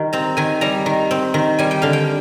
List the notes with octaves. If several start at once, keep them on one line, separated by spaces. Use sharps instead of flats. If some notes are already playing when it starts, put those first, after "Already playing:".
Already playing: D#3 G3
C4 A#5
D#3 G#5
G3 A#5
D#3
C4
D#3
G3 G#5
G5
D3 F5
G5